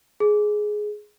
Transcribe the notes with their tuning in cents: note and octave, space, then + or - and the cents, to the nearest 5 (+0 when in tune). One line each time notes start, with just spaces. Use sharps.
G#4 +10